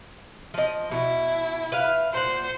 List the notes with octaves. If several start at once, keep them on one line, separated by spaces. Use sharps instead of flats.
F3 D#5
B2 E4
B4 E5 F5
A#2 C5 F#5